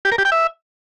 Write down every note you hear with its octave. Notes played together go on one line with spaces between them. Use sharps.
G4
A#4
G4
G5
E5